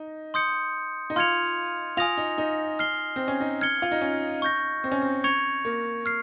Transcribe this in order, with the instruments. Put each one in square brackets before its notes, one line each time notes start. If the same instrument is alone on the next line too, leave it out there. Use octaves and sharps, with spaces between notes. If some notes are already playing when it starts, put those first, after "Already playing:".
Already playing: [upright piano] D#4
[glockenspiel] C6 D#6 G6 C#7
[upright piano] D#4
[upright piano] F4 [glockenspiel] C6 F6 G#6 C#7 F7
[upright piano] F4 [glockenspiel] G#5 D#6 A#6 F7
[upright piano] D#4
D#4
[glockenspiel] F6 C7 G7
[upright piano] C4
C#4
D#4
[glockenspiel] F6 G#6 C#7 G7
[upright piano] F4
D#4
C#4
[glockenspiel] C#6 G6 A#6
[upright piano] C4
C#4
C4
[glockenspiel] C#6 G#6 C#7 F7
[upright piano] A#3
[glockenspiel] F6 C7